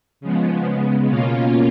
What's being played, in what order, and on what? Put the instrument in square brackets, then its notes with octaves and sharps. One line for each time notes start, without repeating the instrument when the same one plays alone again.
[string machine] C#3 F3 G#3 B3
C#3 G#3 B3
B2 A#3 C#4 F4